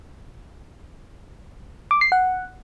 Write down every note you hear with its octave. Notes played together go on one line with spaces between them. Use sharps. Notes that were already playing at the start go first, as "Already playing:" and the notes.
D6
C7
F#5